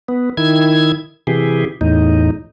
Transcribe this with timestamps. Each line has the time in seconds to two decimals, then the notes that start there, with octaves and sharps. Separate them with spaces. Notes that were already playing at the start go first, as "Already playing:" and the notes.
0.08 B3
0.37 D#3 E4 G#6
1.27 C3 E3 G4 G#4
1.81 E2 A2 D#4